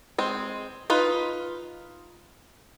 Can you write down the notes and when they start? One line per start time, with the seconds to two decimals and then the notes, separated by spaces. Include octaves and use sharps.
0.18 G#3 C4
0.90 D#4 F4 B4